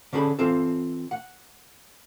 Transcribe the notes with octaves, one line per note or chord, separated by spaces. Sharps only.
D3 C#4 D4 G#4 A4 B5
E3 C4 F4 A4
F#5